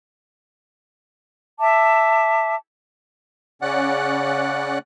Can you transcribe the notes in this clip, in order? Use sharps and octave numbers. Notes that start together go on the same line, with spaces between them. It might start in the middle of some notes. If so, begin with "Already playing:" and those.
E5 A5 D6
C#3 C#4 D5 F#5 F#6